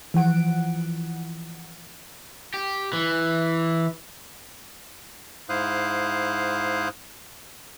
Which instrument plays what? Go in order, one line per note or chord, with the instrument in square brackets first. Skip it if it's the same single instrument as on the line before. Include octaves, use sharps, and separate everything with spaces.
[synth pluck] E3 F3 F#5 D7
[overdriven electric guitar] G4
E3
[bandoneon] G#2 E4 C5 F5 D#6 F#6